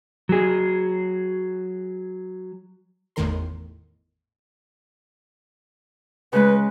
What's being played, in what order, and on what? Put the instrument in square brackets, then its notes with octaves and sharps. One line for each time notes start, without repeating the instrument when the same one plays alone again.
[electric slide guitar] F#3 G#4
[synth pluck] G#1 E2 A2 D#3 A#4 C6
[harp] C#3 G#3 [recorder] B4